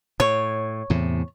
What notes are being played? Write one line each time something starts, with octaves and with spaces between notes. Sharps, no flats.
A2 C#5
E2 A2 C3